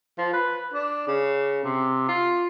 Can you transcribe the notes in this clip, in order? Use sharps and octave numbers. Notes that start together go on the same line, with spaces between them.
F3
B4
D4
C#3
C3
F4